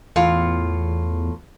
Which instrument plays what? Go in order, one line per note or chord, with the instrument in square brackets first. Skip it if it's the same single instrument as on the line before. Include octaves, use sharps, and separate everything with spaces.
[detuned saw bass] E2 [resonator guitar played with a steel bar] A2 F4